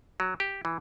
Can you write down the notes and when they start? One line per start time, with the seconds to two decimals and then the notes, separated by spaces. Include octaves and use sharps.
0.20 F#3
0.40 G4
0.65 E3